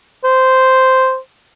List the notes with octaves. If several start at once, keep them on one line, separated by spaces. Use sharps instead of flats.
C5